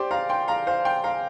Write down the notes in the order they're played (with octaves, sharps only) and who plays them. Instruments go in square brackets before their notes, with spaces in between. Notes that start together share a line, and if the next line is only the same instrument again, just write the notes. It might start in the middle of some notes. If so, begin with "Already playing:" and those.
Already playing: [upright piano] G4 C5 D5
F5 A#5
G5 C6
F5 A#5
C5 F5
G5 C6
F5 A#5